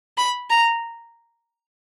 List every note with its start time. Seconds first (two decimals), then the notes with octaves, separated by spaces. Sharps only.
0.17 B5
0.50 A#5